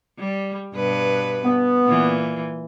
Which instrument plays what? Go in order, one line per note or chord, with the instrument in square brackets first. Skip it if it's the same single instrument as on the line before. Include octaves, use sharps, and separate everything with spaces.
[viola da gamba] G3
G2 B2 B4
[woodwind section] B3
[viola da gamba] A#2 E3